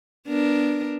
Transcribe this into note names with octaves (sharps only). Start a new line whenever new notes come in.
B3 D4 A#4